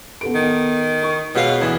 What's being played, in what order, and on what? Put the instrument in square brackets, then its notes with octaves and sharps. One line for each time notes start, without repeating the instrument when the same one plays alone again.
[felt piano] B3 A4 D7
[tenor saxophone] D#3
[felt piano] C#6
[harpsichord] G#2 F4 F5 [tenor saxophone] B2 [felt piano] G#4 C#5
[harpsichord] D2 E3 [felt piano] G#6